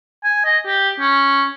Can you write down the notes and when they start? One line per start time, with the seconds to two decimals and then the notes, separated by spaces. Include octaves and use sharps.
0.24 G#5
0.45 D#5
0.66 G4
1.00 C#4